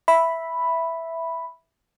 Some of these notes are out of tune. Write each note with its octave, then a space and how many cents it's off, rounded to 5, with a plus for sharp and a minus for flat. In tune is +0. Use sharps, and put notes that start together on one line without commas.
E5 +0 B5 +0